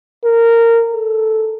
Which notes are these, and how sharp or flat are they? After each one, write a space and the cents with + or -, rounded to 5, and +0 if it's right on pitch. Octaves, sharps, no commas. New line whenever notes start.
A#4 -15
A4 -5